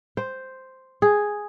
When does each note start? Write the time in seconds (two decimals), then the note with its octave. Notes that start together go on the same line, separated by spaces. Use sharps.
0.17 C5
1.02 G#4